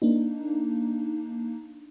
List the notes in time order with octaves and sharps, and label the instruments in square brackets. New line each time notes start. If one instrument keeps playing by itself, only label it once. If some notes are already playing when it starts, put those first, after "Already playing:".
[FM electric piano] A#3 D4 D#4